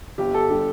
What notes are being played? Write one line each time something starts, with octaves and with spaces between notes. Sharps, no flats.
G1 G4
A4
D3 G3 G4